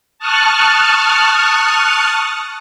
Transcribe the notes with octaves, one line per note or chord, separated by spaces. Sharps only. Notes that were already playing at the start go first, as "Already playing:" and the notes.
A5 C#6 D#6 F6 F#6